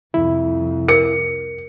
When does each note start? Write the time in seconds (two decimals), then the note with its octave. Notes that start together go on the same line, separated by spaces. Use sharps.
0.14 C2 F2 E4
0.88 A#4 C#7